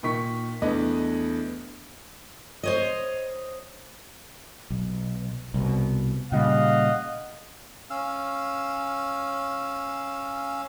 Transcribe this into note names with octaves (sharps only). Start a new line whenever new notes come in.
A#2 D#3 C#6 B6
E2 A3 B3 D4 D#5
C5 C#5 D#5
B1
C2 B2
A#2 C#3 G3 D#5 F5 F#5
C#4 F5 E6